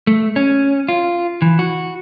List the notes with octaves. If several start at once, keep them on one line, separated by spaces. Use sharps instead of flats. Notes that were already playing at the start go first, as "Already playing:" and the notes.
A3
C#4
F4
E3
F#4